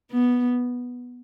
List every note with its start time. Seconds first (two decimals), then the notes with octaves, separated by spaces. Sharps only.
0.11 B3